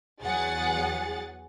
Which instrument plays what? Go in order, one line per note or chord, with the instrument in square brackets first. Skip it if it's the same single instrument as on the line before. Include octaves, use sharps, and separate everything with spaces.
[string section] E2 F#3 G#4 F#5 A6